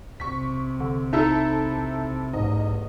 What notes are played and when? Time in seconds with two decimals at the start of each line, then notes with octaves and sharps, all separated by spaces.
0.20 B1 C3 C#6 B6
0.80 D3
1.13 D#4 E4 A4 E5
2.33 A1 E2 G#2 D#5